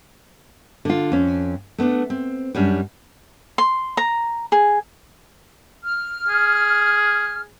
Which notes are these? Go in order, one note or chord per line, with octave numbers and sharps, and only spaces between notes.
D3 F4
F2 C#4
A3 B3 C#4 D4
C4
F#2 G3 C#4 D4
C6
A#5
G#4
F6
G#4